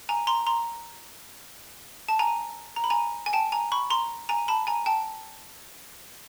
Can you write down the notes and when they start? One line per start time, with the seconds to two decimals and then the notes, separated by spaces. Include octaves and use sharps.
0.09 G#5 A#5
0.27 A#5 C6
0.47 A#5 C6
2.09 A5
2.19 G#5 A#5
2.76 A#5
2.84 B5
2.90 G#5 A#5
3.26 G#5
3.33 G5 A5
3.52 G#5 A#5
3.72 B5 C#6
3.90 A#5 C6
4.29 G#5 A#5
4.48 A5 B5
4.67 G#5 A#5
4.86 G5 A5